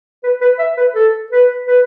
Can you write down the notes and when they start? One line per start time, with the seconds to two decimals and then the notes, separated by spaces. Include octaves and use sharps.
0.24 B4
0.41 B4
0.59 E5
0.77 B4
0.95 A4
1.32 B4
1.67 B4